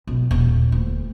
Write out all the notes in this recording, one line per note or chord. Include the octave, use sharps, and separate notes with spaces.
B1
D#1
D2